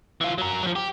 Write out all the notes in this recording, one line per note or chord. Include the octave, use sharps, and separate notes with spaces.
E3 F4
F#3 A#4
F3 F#3
G4